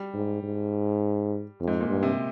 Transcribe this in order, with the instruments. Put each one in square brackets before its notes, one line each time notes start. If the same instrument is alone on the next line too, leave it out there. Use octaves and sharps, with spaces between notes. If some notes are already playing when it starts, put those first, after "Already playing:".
Already playing: [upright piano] G3
[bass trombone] G#2
G#2
F2
[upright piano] G#2
A#2
[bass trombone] G2
[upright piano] C3